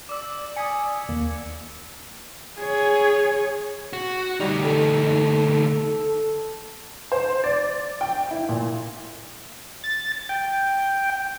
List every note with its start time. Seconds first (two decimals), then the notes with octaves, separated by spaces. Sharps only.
0.09 D5 D6 E6
0.57 G#5 D#6 G#6 B6 C#7
1.09 D#2 A#3
2.59 G#4 C#5
3.93 F#4
4.40 D2 G3 D#4
4.64 A4
7.12 C5
7.44 D5
8.01 G5
8.31 E4
8.49 A#2
9.84 A6
10.29 G5